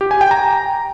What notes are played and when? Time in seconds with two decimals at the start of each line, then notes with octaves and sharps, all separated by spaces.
0.01 G4
0.11 G#5
0.21 G5
0.31 A#5